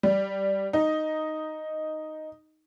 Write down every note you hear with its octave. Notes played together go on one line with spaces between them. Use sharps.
G3
D#4